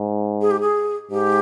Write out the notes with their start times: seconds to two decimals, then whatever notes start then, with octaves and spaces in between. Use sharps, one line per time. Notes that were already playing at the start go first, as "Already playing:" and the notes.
Already playing: G#2
0.41 G#4
0.51 G4
0.60 G#4
1.11 G#2 G4